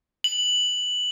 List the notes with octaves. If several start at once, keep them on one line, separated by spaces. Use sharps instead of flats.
F#7